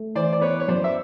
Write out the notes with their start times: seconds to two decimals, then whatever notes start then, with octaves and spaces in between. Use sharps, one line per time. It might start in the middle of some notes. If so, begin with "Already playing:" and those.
Already playing: A3
0.15 E3 C5 D5
0.33 D5
0.41 B3 B4 C#5
0.60 C#5
0.68 F#2 C5 D5
0.84 E5